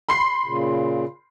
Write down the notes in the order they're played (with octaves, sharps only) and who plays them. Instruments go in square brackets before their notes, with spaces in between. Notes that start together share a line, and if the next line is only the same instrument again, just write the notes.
[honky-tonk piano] B5 C6 C7
[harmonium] A#2 C#3